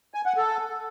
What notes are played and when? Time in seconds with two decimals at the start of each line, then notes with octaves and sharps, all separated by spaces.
0.14 G#5
0.26 F#5
0.37 A4